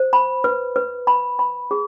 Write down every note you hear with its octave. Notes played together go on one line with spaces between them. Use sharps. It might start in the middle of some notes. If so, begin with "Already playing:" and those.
Already playing: C5
B5
B4
B4
B5
B5
G#4